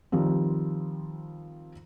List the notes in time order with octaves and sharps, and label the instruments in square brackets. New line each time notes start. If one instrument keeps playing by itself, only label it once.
[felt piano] D#3 F3 G3 C4